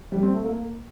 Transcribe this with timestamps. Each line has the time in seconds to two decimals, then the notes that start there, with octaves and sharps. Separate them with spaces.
0.12 G3
0.23 C4
0.33 A3
0.44 A#3